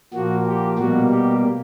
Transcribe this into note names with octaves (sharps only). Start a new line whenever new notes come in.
A#2 F3 A#3 F#4
G4
B2 G3 A#3 F#4
G4